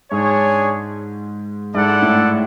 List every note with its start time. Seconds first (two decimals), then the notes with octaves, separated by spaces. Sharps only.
0.11 G#2 D4 G#4 C#5
1.74 G#2 E4 A4 D5 F#5
2.02 A2